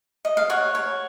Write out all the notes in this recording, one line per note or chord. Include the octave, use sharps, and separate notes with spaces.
D#5
F5
C#5 F#5
C#5